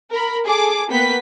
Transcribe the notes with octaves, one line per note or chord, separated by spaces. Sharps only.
A#4 B5
G#4 A4 D6
A#3 B3 B4 G5 B6